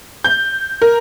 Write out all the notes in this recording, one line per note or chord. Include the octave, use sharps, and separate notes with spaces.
G6
A#4